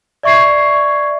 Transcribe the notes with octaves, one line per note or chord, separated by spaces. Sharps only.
D5 E5 C#6 G#6 C7